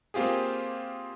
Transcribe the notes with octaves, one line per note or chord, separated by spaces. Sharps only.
A#3 C4 F4 G4 G#4